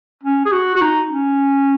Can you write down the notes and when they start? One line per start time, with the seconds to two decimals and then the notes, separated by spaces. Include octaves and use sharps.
0.23 C#4
0.46 G#4
0.52 F#4
0.75 F#4
0.81 D#4
1.10 C#4